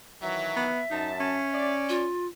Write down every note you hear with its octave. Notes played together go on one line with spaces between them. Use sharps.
D#3 E3 F#3 E5
B3
F#2 D#4 A5
C#4
D5
F4